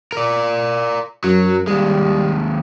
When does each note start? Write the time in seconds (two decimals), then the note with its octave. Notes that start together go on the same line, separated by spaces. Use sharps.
0.12 A#4 D5
1.24 F#2 F#3
1.67 D#2 G3 G#3